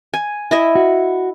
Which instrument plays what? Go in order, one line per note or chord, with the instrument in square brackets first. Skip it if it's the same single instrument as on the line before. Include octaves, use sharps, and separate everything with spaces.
[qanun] G#5
E4 D#5 E5
[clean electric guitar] F#4